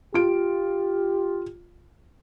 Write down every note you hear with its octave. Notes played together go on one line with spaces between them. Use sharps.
F4 G4 D7